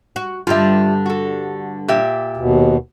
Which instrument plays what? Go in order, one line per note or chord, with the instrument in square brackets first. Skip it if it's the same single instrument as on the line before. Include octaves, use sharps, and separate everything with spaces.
[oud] F#4
[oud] G2 D3 [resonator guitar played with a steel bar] F4 G4 E5
[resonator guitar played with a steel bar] F#4 A4
A#2 G4 E5
[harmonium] D#2 B2